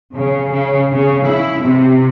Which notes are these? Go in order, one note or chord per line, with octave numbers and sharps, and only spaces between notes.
C#3
C#3
C#3
E4
C3